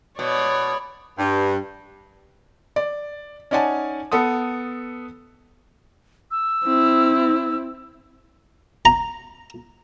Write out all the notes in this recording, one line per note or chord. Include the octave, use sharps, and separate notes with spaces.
B2 C#5 D5
G2
D5
C#4 D#4 D5 F#5 G#5 A5
B3 A4 F#5 D#6
E6
C4 E4
A#5